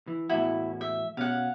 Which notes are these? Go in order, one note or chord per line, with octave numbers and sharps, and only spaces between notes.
E3
E2 A2 E4 F#4
E5
B2 C#4 F5 F#5